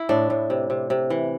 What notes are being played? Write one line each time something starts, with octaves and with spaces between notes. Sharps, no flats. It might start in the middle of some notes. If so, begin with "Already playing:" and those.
Already playing: E4
A2 D4
A2
C3
C3
C3
E3